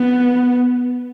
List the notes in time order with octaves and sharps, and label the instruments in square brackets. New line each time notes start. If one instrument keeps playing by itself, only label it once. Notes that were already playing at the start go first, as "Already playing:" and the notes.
Already playing: [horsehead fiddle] B3